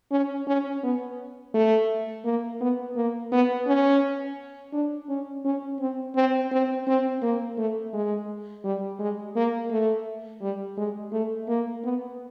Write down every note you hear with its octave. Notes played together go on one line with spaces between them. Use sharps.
C#4
C#4
B3
A3
A#3
B3
A#3
B3
C#4
D4
C#4
C#4
C4
C4
C4
C4
A#3
A3
G#3
G3
G#3
A#3
A3
G3
G#3
A3
A#3
B3